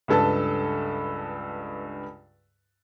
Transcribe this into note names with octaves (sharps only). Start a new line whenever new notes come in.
C#2 G2 A4 B4 A5